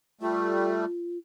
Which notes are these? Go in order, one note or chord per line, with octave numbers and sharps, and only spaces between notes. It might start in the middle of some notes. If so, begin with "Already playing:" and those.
G3 A3 F4